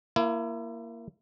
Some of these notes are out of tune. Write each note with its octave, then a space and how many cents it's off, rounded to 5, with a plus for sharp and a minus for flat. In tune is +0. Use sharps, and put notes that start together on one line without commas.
A#3 +0 E4 +30